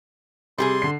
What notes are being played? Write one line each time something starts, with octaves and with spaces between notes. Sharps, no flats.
C3 G3 G4 G#4 C6
D3 C7